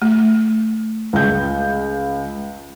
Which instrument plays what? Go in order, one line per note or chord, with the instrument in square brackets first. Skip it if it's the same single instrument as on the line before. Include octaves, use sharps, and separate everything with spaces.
[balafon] A3
[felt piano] C#2 G6